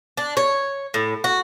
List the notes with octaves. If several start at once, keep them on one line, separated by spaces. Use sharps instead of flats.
D4
C#5
A2
F#4